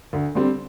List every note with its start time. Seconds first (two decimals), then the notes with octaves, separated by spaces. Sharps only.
0.13 D2
0.35 D3 G3 C4